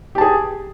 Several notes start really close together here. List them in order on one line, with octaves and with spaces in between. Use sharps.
G4 A5 G#4